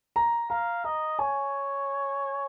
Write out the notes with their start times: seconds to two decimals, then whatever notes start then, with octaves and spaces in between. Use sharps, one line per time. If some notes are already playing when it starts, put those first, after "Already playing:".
0.16 A#5
0.50 F5 A#5
0.84 D#5 A#5
1.19 C#5 G#5